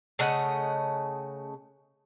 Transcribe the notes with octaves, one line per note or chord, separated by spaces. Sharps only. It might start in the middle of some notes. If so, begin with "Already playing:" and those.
C#3 A3 D#5 F#5